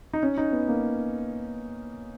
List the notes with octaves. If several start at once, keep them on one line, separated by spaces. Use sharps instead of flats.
D#4
C#4
D#4
B3
A#3